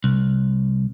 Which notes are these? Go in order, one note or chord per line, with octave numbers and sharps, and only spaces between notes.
C2